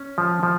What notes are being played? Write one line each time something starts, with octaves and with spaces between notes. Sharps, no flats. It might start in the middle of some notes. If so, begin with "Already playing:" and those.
Already playing: C#4
F3
F3